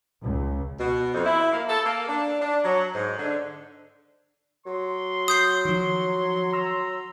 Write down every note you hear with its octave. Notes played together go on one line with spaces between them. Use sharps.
C#2
B2
F2
E4
A#3
A4
A#3
D4
D4
F#3
G#2
D3
F#3 C6
D#6 G6 C7
D#3 F3
A#5 C6 E6